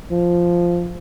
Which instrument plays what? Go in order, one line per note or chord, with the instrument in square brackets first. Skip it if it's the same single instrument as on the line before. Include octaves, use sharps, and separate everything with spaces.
[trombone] F3